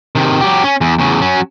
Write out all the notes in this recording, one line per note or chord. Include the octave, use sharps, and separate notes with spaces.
C3 D#3
F#3 G4
C#4
E2
E2 C#3
F#3 C#4